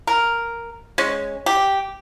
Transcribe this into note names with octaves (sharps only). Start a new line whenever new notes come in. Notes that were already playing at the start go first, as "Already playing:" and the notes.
A#4
G#3 C#4
G4